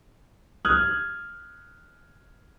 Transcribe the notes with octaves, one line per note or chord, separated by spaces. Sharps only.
D#6 F6 F#6 G#6